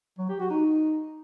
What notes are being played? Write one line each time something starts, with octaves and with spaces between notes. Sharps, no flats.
F#3
G4
F#4
D#4